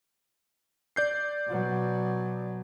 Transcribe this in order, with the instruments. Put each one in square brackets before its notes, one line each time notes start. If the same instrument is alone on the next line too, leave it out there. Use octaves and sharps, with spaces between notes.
[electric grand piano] D5 G6 C7
[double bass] B2 F#3